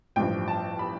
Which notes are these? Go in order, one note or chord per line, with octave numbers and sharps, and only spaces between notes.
A1 G2 F3 G5
A5
B5